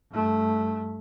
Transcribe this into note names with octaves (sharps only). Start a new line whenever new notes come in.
G2 A3